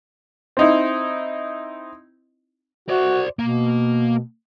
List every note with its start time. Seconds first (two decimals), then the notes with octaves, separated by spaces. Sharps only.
0.57 C4 D#4 E4
2.89 F#4 C5 D5
3.39 B2 A#3